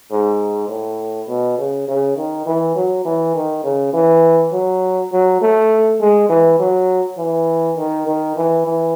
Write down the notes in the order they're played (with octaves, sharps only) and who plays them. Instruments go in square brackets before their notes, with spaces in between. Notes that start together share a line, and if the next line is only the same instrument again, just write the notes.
[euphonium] G#2
A2
B2
C#3
C#3
D#3
E3
F#3
E3
D#3
C#3
E3
F#3
F#3
A3
G#3
E3
F#3
E3
D#3
D#3
E3
E3